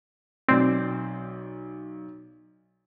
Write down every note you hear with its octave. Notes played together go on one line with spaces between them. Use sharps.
B1 C4 D5